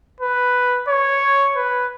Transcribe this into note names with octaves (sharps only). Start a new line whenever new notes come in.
B4
C#5
B4